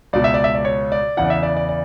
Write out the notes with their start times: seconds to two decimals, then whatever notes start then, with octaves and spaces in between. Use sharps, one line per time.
0.13 C#2 B2 D5
0.24 E5
0.34 D5
0.44 E5
0.55 D5
0.65 C#5
0.92 D5
1.17 E2 C#3 E3 F#5
1.25 D5
1.30 E5
1.43 D5
1.57 D5
1.69 D5